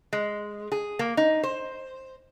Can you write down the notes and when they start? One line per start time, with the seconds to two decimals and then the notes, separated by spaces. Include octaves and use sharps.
0.13 G#3
0.72 G#4
0.99 A#3
1.17 D#4
1.43 C5